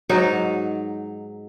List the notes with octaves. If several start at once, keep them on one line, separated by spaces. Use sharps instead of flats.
G#2 F#3 D#4